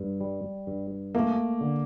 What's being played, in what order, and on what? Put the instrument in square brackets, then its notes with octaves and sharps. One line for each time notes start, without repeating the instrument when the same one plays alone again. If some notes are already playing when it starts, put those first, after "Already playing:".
Already playing: [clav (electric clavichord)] G2
G3
G2
[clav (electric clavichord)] A3 [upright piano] A#3
[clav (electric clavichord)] D3